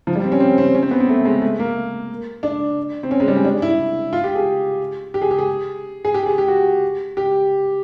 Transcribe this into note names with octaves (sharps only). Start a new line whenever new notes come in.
F3
G3
C4
C#4
C4
C4
C#4
C4
B3
C4
A3
G#3
A3
A#3
D4
C4
C#4
G#3
G3
C#4
D4
E4
F4
G4
G#4
G4
G#4
G4
G#4
G#4
G4
G#4
G4
F#4
G4